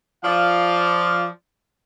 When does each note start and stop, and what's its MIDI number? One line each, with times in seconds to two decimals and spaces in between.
0.24 1.26 53
0.24 1.26 74
0.24 1.26 77